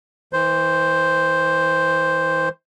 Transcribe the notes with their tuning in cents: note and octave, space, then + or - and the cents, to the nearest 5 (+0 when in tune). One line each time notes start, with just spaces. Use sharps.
E3 -30 C5 +0